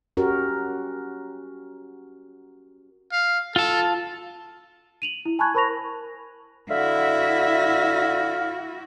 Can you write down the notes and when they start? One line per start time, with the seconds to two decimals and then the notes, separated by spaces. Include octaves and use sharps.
0.17 C#4 F#4 G4 A#4
3.12 F5
3.56 F4 A4 A5
5.02 D#7 F7 F#7
5.25 E4
5.39 G#5 A5 B5 C#6 F#6 G#6
5.55 A#4 C5 B5 C#6 A#6 F7
6.70 D3 E4 F#4 E5 F5